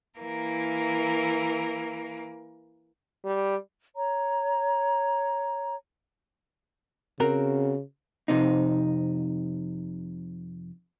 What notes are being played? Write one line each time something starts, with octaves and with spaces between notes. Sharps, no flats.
E3 A#3 A#4
G3
C#5 A#5
C#3 C4 F#4 A#4
F2 C3 D#4